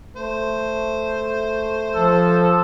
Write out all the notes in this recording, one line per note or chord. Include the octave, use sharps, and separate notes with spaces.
A3 C5
F3 A4